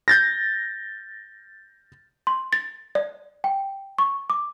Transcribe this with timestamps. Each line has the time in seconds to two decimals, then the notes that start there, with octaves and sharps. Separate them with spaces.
0.08 G6 A6 A#6
2.27 C6
2.53 A6
2.95 D5
3.44 G5
3.98 C#6
4.30 D6